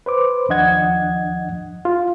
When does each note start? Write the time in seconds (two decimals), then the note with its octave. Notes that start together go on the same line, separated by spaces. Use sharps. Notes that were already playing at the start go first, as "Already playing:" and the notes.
0.06 B4 C5 D6
0.49 D#2 F3 D4 D#5 F#5 G#6
1.85 F4